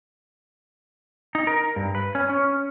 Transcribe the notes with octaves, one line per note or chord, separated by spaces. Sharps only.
D#4
A#4
G2
B4
C#4
C#4